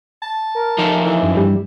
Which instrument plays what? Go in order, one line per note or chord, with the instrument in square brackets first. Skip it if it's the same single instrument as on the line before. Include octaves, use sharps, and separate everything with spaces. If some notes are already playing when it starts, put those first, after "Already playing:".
[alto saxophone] A5
[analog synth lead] A#4
[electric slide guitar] F3 D#4 A4
[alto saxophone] E3
[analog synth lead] F#2
[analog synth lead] G2 [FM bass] G3